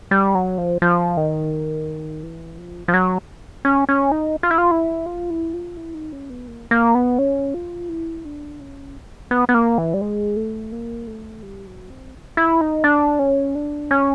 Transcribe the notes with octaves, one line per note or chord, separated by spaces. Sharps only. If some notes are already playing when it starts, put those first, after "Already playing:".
G3
F#3
F3
F3
D#3
E3
F3
F3
F#3
C#4
C#4
D#4
F4
E4
F4
E4
F4
E4
F4
E4
D#4
C#4
B3
A#3
A#3
B3
C#4
F4
E4
D4
C#4
B3
B3
A#3
E3
G3
G#3
A3
A#3
A3
G3
F#3
C4
E4
D#4
D4
C#4
D4
C#4